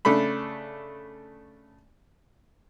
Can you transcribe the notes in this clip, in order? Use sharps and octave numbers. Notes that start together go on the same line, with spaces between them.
C#3 A3 D4 B5